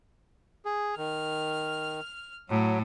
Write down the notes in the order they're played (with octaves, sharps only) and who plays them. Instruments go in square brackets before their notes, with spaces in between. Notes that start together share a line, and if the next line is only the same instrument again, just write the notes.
[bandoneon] G#4
[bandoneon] D#3 [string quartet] F6
[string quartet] A2 [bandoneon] F#3